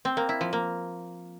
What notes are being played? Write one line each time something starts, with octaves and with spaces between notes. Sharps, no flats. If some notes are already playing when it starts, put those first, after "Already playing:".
C4
A#3
E4
F3
A#3